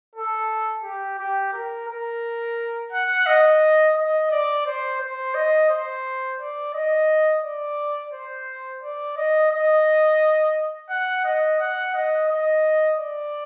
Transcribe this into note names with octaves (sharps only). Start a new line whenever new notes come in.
A4
G4
G4
A#4
A#4
F#5
D#5
D#5
D5
C5
C5
D#5
C5
D5
D#5
D5
C5
D5
D#5
D#5
F#5
D#5
F#5
D#5
D#5
D5